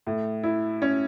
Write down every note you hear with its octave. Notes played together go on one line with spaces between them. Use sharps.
A2
E4
C#4